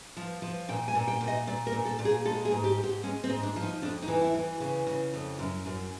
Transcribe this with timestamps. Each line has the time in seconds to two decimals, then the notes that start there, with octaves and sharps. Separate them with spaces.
0.17 F3
0.42 F3
0.69 A#2 G5
0.88 G#5
0.95 A#2
1.08 G5
1.21 A#2
1.28 D#5
1.47 A#2 D5
1.67 A#4
1.73 A#2
1.85 A4
1.99 A#2
2.05 G#4
2.25 G#3 A4
2.45 G#4
2.52 G#2
2.64 G4
2.78 G#2
2.83 G4
3.03 G#3 C#4
3.24 C4
3.30 G#2
3.43 D4
3.56 F3
3.63 D#4
3.82 F2 D4
4.02 D#4
4.08 E3
4.21 E4
4.34 E3
4.60 C#3
4.87 C#3
5.14 F2
5.39 F#2
5.66 F#2